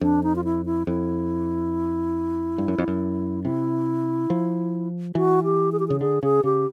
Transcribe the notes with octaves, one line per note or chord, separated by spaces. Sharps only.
F2 D4
D#4
F4
E4
E4
F2 E4
G2
F#2
F2
F#2
C3 E4
F3
E3 F#4
G4
G#4
G4
C#3 G#4
D3 G#4
C#3 G#4
C#3 G4